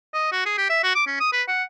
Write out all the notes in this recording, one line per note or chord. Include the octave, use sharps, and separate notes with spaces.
D#5
F#4
G#4
G4
E5
F#4
D6
C#4
D#6
B4
F#5